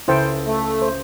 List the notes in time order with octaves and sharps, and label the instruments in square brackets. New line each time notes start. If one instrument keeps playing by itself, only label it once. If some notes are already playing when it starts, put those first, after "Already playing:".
[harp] C#2 A4 E5 [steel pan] E4 C5 G5
[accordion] A3
[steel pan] C5